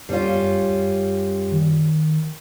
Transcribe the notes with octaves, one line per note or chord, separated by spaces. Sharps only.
F#2 G3 C#4 F4
F#2
D#3